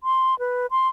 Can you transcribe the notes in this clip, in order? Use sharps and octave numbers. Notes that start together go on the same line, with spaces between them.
C6
B4
C6